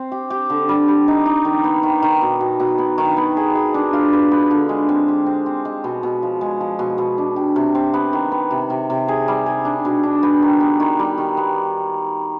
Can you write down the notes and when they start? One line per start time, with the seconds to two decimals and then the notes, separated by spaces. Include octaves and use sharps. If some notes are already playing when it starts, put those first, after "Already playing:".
Already playing: C4
0.12 G4
0.30 G4
0.50 D3
0.69 G3
0.88 G3
1.08 D#4
1.26 D#4
1.45 D#3
1.64 B3
1.83 D#3
2.03 D#3
2.22 B2
2.40 B2
2.60 B2
2.78 B3
2.98 D#3
3.17 B3
3.37 G#4
3.55 G#4
3.74 D4
3.93 F4
4.13 B4
4.31 B3
4.51 D3
4.69 G#3
4.89 C4
5.08 G4
5.26 C4
5.46 C4
5.65 G#3
5.84 B2
6.03 B2
6.23 F3
6.41 G#3
6.61 F3
6.79 B2
6.98 B2
7.18 D4
7.36 G4
7.56 C3
7.75 C4
7.94 B3
8.13 D#3
8.32 B3
8.51 C3
8.70 C3
8.90 C3
9.08 G#4
9.28 G3
9.46 G#4
9.65 D4
9.85 B2
10.03 D4
10.23 B3
10.42 D#3
10.60 B3
10.80 D#3
10.99 G3
11.18 D#3
11.37 B3